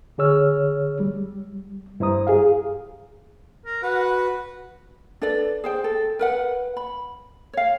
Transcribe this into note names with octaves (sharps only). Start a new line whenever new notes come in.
D3 G#4 C#5 E6 F6
G3
G2 E4 C5 A#5 D#6
G4 G#4 F5
A#4
F#4 B4 F#5
D4 A4 B4 D5
G#4 C5 G5
A4
A#4 B4 F#5
B5
C#5 F5